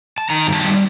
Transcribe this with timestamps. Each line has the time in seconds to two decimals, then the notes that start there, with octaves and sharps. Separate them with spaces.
0.18 A5
0.30 D#3 A#5
0.47 G2
0.53 A5
0.64 G3